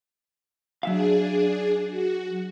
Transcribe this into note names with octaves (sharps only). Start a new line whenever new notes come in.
F#3 D4 G#4 E5 F5
F#4